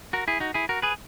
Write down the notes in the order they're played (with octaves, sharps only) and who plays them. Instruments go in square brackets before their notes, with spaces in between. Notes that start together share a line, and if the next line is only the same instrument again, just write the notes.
[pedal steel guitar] F#4 A#4
E4 G#4
D#4 F#4
E4 G#4
F#4 A#4
G#4 B4